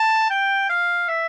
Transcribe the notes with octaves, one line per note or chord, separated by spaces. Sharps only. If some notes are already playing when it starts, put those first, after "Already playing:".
Already playing: A5
G5
F5
E5